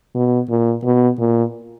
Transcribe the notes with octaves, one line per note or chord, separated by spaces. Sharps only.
B2
A#2
B2
A#2